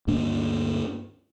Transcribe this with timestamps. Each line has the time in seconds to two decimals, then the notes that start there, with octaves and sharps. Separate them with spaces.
0.07 D2 G2 A#3 D4